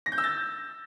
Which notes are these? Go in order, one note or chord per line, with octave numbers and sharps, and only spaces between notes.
A#6
G6
E6
A6